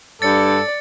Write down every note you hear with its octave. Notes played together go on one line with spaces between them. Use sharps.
G2 A4 D5 A6 C#7